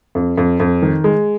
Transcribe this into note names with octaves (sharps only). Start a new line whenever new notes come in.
F2
F2
F2
D#3
G#3